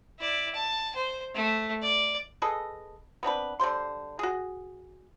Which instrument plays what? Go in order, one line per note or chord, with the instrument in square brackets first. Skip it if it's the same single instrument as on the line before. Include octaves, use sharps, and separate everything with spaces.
[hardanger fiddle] E4 D5
A5
C5
A3
D5
[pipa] G#4 A4 B4 D#5
B3 C4 D4 B4
D3 G3 C5 C6
F#4 G#4